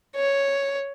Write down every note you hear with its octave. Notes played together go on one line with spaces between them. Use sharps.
C#5